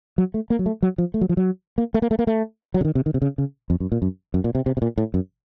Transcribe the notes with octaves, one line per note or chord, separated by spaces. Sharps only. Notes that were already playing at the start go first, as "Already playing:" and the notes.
F#3
A3
A#3
F#3
A3
F#3
F3
A3
F#3
F3
F#3
A#3
A3
A#3
A3
A#3
A3
F#3
C#3
D#3
C3
D#3
C3
C#3
C#3
F2
F#2
A#2
F#2
F#2
A#2
C3
C3
C3
A#2
A2
F#2